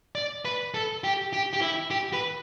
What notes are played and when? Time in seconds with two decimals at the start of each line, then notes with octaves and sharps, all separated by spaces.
0.15 D5
0.45 B4
0.74 A4
1.04 G4
1.33 G4
1.53 G4
1.62 E4
1.91 G4
2.13 B4